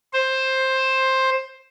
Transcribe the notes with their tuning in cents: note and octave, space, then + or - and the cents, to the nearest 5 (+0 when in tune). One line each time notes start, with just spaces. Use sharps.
C5 +10